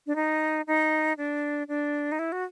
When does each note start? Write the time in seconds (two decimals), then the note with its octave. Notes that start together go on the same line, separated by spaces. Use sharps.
0.07 D4
0.16 D#4
0.67 D#4
1.18 D4
1.68 D4
2.12 D#4
2.19 E4
2.32 F#4